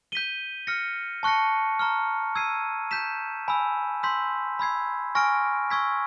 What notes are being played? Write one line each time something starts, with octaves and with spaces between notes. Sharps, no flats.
G6 B6 D#7 G7
F6 A#6 C#7
A5 C#6 F#6 A#6 C#7
A#5 C#6 F6
E6 G#6 C7 D#7
G6 B6 E7
G#5 B5 E6
C6 E6 G6 B6
B5 E6 G#6 C7
G#5 C#6 F6 A#6 D7
C#6 E6 G#6 B6